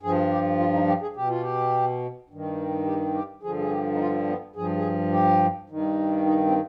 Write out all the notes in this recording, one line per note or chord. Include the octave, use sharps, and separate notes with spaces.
G2 F3 G#4
G4
F4
D#4
G4
G#4
B2 G4
F4
G4
G2 D#3
G4
G4
G2 D3 F3 G#4
G#4
G4
D#4
F4
B3
G2 F3 G#4
G#4
G4
G2 D#3
D#4
C4